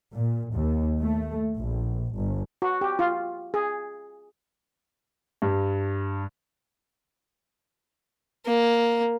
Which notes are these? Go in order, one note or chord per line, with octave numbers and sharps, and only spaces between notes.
A#2
D#2
A3
A#1
G1
F#4
G4
F4
G#4
G2
A#3